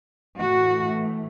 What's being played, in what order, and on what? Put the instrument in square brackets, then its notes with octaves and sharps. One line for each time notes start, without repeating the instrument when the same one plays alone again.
[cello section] A2 E3 A3 F#4